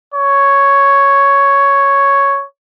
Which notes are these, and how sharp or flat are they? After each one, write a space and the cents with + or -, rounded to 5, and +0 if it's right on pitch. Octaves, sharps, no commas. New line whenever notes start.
C#5 +0